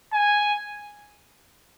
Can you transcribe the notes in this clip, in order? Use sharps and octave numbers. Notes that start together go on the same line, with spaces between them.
G#5